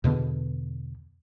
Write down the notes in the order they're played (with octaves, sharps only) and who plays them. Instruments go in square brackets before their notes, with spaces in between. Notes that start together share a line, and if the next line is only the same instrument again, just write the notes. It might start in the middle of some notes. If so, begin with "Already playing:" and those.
[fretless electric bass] E2 B2 D3 B3